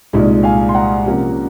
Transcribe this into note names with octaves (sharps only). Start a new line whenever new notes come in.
C2 A#2 G#3 D#4
F5 G#5
C6
F#5 A#5
C3 F3 A#3 C#4